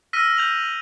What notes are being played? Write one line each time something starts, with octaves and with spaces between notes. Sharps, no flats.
E6 F6 A#6 B6 D#7
G6 F7 F#7